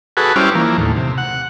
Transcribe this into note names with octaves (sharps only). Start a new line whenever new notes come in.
F#4 G#4 A4 B4
G3 C#4 E4 C5 D6 F6
E3 F3 A#3
D#2 A2
C3
F#5